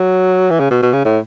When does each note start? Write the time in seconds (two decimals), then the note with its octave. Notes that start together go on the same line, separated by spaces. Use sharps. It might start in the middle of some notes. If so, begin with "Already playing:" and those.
Already playing: F#3
0.50 E3
0.60 C#3
0.71 B2
0.83 B2
0.93 C#3
1.05 A2